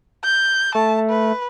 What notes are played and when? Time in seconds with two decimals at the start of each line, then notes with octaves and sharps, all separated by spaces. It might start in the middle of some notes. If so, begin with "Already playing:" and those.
0.24 G6
0.75 A3 A5
1.09 B4